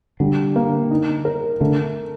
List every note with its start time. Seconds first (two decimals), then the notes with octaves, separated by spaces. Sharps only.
0.20 D3 G3
0.56 A#3
0.91 D#4
1.25 A#4
1.60 D3 A3